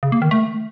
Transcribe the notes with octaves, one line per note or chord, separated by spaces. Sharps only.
C#3
A#3
D#3
A3